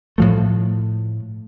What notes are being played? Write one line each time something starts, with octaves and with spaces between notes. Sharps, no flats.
A2 F3 A3